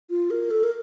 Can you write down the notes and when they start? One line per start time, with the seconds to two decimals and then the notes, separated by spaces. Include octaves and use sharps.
0.10 F4
0.30 A#4
0.51 A4
0.63 A#4